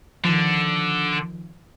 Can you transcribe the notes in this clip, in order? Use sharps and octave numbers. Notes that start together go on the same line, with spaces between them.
D3 D#3 F3